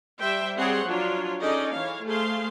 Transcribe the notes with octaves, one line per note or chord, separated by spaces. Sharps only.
G3 C5 E5 G5
G3 C4 G#4 C#5 F#5 C6
F3 F#3 D4 F4 C#5
C#4 D#4 G#4 A4 D5 D#5
E3 C#5 F5
A3 G#4 C5 F5 C6